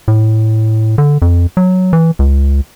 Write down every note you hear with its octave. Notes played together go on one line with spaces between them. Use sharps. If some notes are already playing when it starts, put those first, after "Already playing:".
A2
D3
F2
F#3
E3
C#2